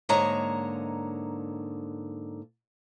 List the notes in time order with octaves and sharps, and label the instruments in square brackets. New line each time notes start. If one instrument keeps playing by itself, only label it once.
[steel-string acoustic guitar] G#2 D3 A#3 C#5 D#5 A#5